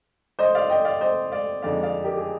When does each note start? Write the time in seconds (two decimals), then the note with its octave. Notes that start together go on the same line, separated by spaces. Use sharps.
0.39 C5 D#5
0.55 D5 F5
0.70 D#5 G5
0.85 D5 F5
1.01 C5 D#5
1.32 D5 F5
1.62 F2 D3 G#3 D#4 D5 F5
1.83 D5 F5
2.04 G4 A#4
2.17 G#4